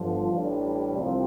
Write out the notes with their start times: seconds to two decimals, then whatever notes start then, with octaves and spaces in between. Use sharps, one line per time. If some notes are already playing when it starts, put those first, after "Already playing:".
Already playing: G1 G2 D3 F3
0.28 A1 A2 G3 D4
0.93 C2 C3 F3